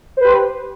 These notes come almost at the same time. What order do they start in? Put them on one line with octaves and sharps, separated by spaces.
C5 B4 G4